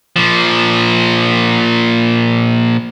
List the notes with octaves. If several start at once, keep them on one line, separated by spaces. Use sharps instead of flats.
A#2 F3